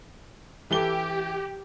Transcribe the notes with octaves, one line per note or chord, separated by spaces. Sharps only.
E3 G4 A4 G7